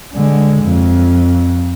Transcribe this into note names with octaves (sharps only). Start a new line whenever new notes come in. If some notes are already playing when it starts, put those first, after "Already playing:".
D3 G#3
F2